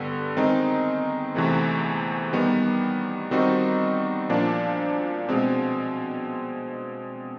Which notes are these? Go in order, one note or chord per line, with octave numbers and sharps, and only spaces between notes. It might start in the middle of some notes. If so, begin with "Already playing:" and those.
Already playing: G2 D3 G3 B3
D#3 G#3 C4 D#4
E2 C3 E3 A3
D#3 G3 B3
D#3 G3 C4 D#4 F#4
A#2 F3 A#3 D4
B2 G#3 C4